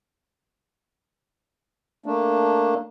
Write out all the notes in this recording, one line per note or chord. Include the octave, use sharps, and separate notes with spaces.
A3 A#3 D4